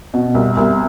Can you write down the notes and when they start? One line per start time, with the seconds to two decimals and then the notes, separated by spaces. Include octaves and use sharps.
0.14 B2
0.35 C2
0.57 C2